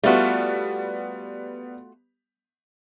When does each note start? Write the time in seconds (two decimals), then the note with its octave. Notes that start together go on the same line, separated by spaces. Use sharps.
0.04 G3 A3 B3 F4 F#4